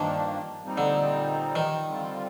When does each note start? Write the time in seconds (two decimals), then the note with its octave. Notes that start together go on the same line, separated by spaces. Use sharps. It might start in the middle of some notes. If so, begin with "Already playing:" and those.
Already playing: G2 D#3 F3 A#3 D4
0.62 A#2 G3 C4 D#4
0.78 D3
1.56 D#3
1.86 D3 G3 C4 F4